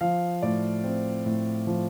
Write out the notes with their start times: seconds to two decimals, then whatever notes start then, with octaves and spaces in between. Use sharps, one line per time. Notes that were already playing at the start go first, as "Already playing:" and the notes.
0.01 F3 F5
0.42 A2 D5
0.84 C4
1.26 A2
1.67 F3